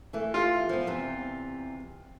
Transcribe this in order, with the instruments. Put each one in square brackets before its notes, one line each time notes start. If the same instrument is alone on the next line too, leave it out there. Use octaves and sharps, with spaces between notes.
[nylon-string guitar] E3 A3
[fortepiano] F4
[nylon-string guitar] F3 B3
E2 C3